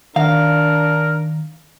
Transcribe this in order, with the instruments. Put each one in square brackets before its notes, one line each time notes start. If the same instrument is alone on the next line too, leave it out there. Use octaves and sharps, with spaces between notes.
[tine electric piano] D#3 [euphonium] D4 [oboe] A#4 [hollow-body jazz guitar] F5